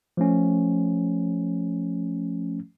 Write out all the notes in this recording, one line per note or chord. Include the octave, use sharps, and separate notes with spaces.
F3 A3 C#4